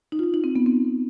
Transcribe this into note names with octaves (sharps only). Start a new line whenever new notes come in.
D#4
F4
D#4
D#4
C4
B3
C4